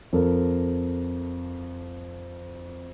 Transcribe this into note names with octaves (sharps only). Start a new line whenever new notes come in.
F2 A4 A#4